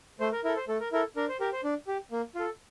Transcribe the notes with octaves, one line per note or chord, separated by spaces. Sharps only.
A3 C5
A#4
E4 A4 A#4
C5
A3 A4
A#4
E4 A4 A#4
D4 A#4
C5
G4 A#4
C5
D4
G4
A#3
F4 A4